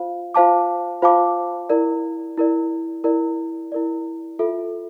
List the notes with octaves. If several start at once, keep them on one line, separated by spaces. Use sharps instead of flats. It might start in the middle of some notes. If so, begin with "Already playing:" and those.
Already playing: F4 C5 F5
F4 C5 F5 A5 D6
F4 C5 F5 A5 D6
E4 A#4 D5
E4 A#4 D5
E4 A#4 D5
E4 A#4 D5
F4 A4 E5